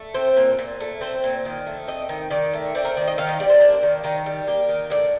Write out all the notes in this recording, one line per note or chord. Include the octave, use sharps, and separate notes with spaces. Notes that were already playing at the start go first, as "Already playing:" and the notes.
Already playing: A3
C4 C5
A#2
A#2
A3
C4 C5
A#2
D#3
A3
C4 D#5
D#3
D#3 D5
A3
C4 D5
A#4
D#3 D5
D#5
D#3 F5
D#5
G3 D5
C5
A#3 D4
D#3
D#3 D#4
G3
A#3 G4
D#3
A2 D5